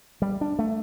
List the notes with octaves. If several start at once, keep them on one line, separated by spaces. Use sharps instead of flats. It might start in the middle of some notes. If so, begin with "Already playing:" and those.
G3
D4
A3